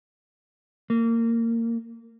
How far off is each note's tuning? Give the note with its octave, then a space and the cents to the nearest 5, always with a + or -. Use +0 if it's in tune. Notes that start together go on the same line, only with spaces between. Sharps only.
A#3 -20